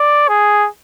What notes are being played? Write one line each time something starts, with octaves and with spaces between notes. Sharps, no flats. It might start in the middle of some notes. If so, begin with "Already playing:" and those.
Already playing: D5
G#4